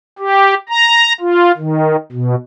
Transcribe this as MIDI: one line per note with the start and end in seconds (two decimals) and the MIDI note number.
0.19 0.54 67
0.69 1.13 82
1.20 1.52 65
1.57 1.96 51
2.12 2.35 47